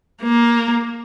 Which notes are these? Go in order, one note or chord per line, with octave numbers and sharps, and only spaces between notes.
A#3